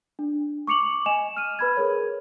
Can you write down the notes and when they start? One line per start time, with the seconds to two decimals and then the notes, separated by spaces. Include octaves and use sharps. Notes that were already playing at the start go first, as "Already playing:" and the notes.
0.19 D4
0.67 C#6 D6 C#7 F7 F#7
1.06 D#5 G#5 E7 F7
1.37 F6 D#7
1.59 B4 B5 G#6
1.77 G#4 A#4 C#5